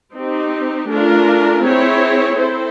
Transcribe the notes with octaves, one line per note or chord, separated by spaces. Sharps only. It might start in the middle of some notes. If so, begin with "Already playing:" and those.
C4 D#4 G4
A3 D4 F4 A#4
C4 E4 G#4 C#5
C4 E4 A4 C5